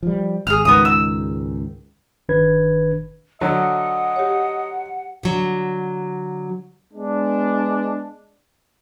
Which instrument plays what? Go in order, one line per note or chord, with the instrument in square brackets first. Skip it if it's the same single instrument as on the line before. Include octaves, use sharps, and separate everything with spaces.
[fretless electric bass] F3 G3
[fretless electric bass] G#1 [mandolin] G#4 F6
[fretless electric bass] C#2 G#2 D#3 [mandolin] B3 D#5 D#6
[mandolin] E6
[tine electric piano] G1 D#3 D4 B4 G#6
[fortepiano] D3 F#3 [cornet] D#5 [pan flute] F#5
[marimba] G4 C#5
[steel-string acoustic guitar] D3 F#3
[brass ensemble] G#3 B3 D4